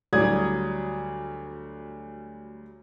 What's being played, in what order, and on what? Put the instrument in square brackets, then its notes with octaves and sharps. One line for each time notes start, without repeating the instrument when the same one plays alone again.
[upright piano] D2 F#3 G3 D5 D#6 G#6